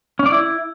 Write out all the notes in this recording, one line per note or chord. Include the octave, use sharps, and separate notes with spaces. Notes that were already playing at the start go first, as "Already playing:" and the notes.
C#4
D5
E4